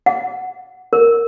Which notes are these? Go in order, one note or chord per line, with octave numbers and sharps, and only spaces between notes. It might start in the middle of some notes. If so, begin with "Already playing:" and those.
F#5
A#4